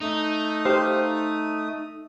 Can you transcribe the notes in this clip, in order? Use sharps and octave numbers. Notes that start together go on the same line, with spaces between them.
A3 D#4 D#6
G4 C5 F5